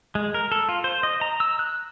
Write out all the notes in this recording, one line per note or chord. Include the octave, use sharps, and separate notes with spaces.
G#3
A#4
A4
F4
C5
D#5
A#5
E6
F#6